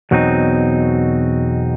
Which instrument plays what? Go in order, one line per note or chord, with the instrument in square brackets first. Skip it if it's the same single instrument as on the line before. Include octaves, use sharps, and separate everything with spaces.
[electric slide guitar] E2 B2 F#3 C4 D#4